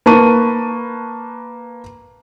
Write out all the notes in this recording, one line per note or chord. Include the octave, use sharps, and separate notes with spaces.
A#3 B4 A5 C#6 D#7